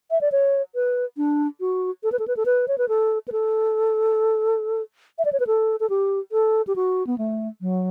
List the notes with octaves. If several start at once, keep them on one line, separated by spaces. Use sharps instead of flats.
E5
D5
C#5
B4
D4
F#4
A4
B4
A4
B4
A4
B4
C#5
B4
A4
B4
A4
E5
D5
C#5
B4
A4
A4
G4
A4
G4
F#4
B3
A3
F#3